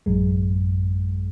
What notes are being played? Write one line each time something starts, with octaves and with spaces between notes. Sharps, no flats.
A1 F#2 G#3